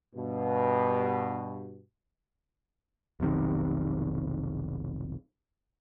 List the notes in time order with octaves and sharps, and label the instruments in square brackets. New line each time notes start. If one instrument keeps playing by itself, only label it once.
[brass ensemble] G2 B2
[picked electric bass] F1 B1 C3 D#3